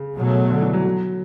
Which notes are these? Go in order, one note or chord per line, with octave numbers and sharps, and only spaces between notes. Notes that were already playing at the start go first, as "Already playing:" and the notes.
Already playing: C#3
B2 F#3 A3
D3
E3
F#3
F#3